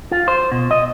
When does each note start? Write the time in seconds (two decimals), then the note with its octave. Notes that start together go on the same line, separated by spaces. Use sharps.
0.11 F4
0.28 C5
0.52 B2
0.71 D#5